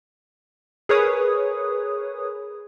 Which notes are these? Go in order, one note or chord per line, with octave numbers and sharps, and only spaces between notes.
G#4 A#4 B4 C#5 D#6